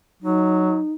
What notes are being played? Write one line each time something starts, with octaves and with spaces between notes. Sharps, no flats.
F#3 D#4